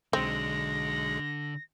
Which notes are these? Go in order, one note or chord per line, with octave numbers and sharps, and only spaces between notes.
B1 D3 G#3 C4 A#6